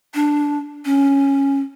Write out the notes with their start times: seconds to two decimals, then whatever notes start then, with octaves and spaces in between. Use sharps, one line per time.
0.14 D4
0.85 C#4